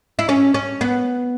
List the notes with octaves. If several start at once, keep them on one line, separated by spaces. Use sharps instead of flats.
E4
C#4
C#4
B3